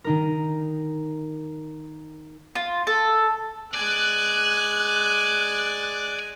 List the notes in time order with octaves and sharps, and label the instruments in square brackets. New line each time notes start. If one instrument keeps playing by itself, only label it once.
[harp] D#3 D#4 A#4
[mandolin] F4
A4
[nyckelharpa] G#3 G#5 [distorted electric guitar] D5 [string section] F#6